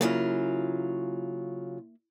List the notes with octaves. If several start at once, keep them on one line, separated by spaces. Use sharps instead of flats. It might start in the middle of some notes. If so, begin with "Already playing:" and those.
C#3 F#3 A#3 E4 F4